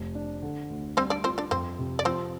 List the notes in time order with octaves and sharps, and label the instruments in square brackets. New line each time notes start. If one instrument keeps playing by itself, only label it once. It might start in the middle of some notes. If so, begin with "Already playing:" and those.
Already playing: [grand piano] F1
D4
D3
D2
[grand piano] G3 [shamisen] C4 C5
[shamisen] D4 D5
[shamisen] C4 C5 [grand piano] F4
[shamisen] D4 D5
[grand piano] F2 [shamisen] C4 C5
[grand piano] C3
[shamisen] D5
[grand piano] F3 [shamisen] C4 C5